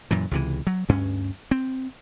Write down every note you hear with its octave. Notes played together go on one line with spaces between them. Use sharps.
F#2 A#2 E3
C#2 C3 E3
F#3
D2 G2 C#4
C4